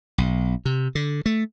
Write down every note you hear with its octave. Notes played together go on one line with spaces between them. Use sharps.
B1
C3
D3
A3